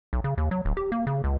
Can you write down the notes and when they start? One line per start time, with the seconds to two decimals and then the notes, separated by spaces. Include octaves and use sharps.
0.13 B1
0.24 C#3
0.38 D#2
0.51 F#3
0.65 D1
0.77 G4
0.92 A#3
1.07 C#3
1.24 C#2